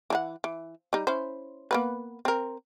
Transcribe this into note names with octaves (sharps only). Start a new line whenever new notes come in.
E3 D#4 F#5
E3
G3 D#4
C#4 E4 C5
A#3 B3 B4
C4 A#4